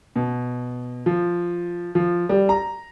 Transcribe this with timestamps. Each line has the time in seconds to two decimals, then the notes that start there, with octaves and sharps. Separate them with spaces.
0.16 B2
1.06 F3
1.95 F3
2.29 G3
2.49 A#5